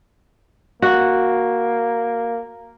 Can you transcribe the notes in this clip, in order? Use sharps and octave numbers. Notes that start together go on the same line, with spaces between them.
A#3 F#4